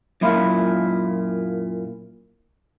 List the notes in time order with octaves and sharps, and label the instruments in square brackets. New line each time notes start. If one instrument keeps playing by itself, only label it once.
[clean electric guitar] F#2 A#2 E4 F4